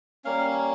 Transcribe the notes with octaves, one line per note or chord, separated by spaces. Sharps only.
G3 A#3 C#4 F5